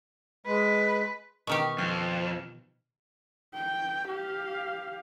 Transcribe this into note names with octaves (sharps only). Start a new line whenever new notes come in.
G#3 B4
B2 D#3 G4 C#6 F6
F2 F6
G5
G4 F5